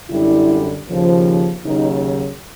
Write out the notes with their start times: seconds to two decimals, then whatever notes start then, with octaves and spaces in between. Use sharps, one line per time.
0.10 F#2 D3 G3 E4
0.87 D#2 C#3 F3
1.65 D#2 C#3 F#3 D#4